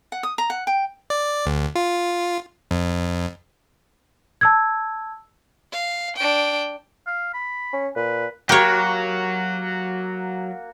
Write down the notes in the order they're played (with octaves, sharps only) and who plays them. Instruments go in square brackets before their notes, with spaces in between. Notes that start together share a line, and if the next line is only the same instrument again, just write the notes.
[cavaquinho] F#5
D#6
A#5
F#5
G5
[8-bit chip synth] D5
D2
F4
F2
[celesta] A5 E6 G#6
[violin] F5
D4 G5
[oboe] F5
B5
[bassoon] C#4
[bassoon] A#2 [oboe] B4
[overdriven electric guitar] F#3 [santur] A#3 F#4 [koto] G4 C#5